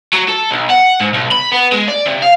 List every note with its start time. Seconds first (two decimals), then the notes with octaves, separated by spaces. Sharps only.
0.13 F#3
0.28 A4
0.51 B1
0.70 F#5
1.01 G#2
1.14 B1
1.32 B5
1.52 B3
1.72 G#3
1.88 D5
2.06 C3
2.22 F5